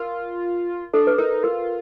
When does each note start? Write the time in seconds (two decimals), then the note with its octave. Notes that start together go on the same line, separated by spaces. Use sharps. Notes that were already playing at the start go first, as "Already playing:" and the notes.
Already playing: F4 A#4
0.93 D4 A4
1.07 B4
1.18 D#4 A#4
1.43 F4 A#4